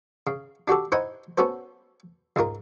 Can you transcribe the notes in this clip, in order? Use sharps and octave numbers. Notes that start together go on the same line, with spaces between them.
C#3
D4 F#4 G4 A4
D#4 E4 C5 D#5 F#5 G#5
B3 C#4 F#4 A4 C5
C#2 G#2 F4 A#4